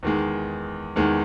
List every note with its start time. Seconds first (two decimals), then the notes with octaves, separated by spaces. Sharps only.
0.03 E2 D#3 G#3
0.96 E2 D#3 G#3